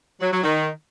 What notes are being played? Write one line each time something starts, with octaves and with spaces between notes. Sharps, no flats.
F#3
F#3
D#3